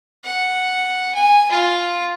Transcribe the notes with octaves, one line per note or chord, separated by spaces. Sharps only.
F#5
G#5
F4 F5